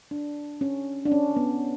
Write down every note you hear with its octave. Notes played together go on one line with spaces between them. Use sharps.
D4
C#4
D4
C#4
B3